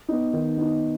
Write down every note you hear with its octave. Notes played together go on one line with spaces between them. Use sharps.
B3 D#4
D#3
B3 D#4